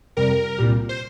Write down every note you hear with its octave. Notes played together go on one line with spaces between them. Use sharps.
F2 C3 G3 A#4
C2 A#2 G3
C5